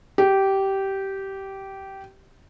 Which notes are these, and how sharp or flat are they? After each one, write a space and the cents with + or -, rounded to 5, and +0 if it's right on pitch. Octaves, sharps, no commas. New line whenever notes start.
G4 -15